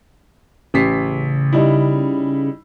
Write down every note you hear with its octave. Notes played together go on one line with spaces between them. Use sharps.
A1 C#3 B6 C7
G3 D#4 E4